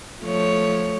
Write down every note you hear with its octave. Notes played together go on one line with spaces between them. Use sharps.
F3 A3 C#5